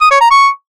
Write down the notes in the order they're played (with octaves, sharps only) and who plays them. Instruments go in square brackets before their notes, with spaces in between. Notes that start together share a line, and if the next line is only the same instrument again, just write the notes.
[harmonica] D#6
C#5
A#5
C#6